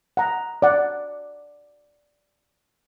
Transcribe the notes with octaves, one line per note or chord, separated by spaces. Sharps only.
F#5 A#5
D5 F#5